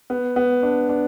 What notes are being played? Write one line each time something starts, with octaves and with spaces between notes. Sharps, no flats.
B3
B3
D4
D4